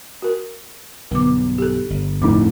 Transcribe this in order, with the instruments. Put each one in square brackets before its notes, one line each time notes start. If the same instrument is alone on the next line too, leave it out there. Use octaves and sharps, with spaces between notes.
[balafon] F#4 A#4
[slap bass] B1 G2 [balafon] D3 B3 D6
[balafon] G4 A4
[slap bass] G1
[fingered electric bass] F2 A2 [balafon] C#4 D#4 D6